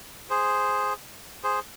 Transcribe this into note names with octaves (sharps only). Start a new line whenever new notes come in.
G#4 C5
G#4 C5